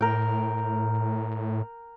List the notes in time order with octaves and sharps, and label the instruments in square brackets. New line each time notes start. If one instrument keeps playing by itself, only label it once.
[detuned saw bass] A2 [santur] A#4 G5